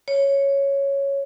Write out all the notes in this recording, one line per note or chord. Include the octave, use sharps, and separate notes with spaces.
C#5